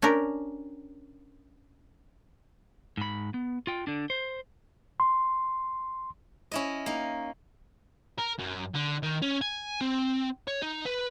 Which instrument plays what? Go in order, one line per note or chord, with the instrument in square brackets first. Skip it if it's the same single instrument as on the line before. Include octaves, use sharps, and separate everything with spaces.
[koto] C#4 D4 G4 A#4
[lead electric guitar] G#2 B5
B3
F4 G5
D3 D4
C5
[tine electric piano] C6
[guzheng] C#4 E4 D#5
A#3 D#4
[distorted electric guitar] A#4
F#2
D3
D#3
C#4
G#5
C4
C#5
D#4
B4